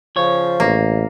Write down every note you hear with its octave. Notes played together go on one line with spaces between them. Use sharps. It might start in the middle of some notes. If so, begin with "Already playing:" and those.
C#3 F3 C#5
A1 A#3